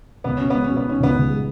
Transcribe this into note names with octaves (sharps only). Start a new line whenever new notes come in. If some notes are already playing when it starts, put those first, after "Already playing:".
C#2 B3
B2 C#4
G#3 B3
C#4
B2
B3
C#4 D#4
C#2 B3
C#2
G#3